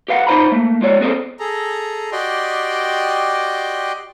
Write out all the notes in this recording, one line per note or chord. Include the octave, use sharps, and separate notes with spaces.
G4 B4 F5 F#5
D#4 F4 C5 A#5 B5
A3 A#3
G#3 F4 C#5 D5
B3 C4 G#4 A4 C5
G#4 A4 A#5
F#4 G4 D5 D#5 G5 C6